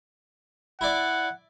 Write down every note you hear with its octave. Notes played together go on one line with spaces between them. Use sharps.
E4 D5 F#5